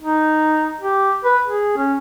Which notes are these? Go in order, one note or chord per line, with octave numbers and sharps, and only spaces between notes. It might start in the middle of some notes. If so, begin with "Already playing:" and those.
D#4
G4
B4
G#4
C#4